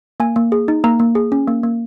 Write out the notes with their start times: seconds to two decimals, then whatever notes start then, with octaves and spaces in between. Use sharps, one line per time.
0.20 A#3 G#5
0.36 A#3
0.52 G#4
0.68 D#4
0.84 A#3 A#5
1.00 A#3
1.15 G#4
1.32 C#4
1.48 A#3
1.63 A#3